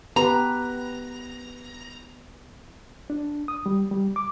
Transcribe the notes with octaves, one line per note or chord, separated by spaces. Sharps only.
B3 G4 B4 A#5
D4
D#6
G3
G3
D6